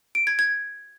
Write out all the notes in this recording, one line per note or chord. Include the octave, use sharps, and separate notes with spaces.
D7
G#6
G#6